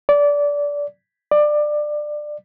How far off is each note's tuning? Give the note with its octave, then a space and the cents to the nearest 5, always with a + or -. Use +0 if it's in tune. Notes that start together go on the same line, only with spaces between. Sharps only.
D5 -20
D5 +20